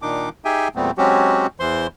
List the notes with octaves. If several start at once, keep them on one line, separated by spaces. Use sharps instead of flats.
A#2 D#3 D4 D#4 D6
D#4 G4 G#4 E5 G5 G#5
E2 A#2 G3 A3 B3 C4
F#3 G#3 C4 C#4 F#4 G4
E2 E3 C5 C6